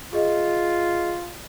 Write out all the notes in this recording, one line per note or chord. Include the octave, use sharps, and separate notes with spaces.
F4 G#4 D#5